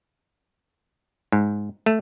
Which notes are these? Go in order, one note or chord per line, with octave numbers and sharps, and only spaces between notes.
G#2
A3